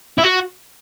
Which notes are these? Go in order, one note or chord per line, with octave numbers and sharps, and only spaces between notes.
E4
F#4